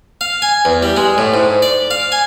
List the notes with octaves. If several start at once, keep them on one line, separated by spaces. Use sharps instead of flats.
F5
G#5
E2
G3
G#3
A2
G#2
D5
F5
G#5